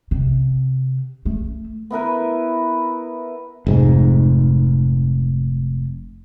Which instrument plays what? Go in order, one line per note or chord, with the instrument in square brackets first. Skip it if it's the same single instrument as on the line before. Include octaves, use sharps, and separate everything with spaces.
[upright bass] C3
A3
[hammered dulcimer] B3 E4 A#4 B4
[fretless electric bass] F1 G#2